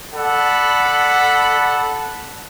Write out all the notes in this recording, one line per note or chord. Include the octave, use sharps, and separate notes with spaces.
A4 D5 F#5 B5